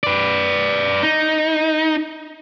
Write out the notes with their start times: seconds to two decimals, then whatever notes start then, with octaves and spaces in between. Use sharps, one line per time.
0.04 B4 D5
1.03 D#4